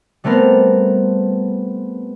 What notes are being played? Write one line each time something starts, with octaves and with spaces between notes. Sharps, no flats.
G3 A3 B3 C4 A#4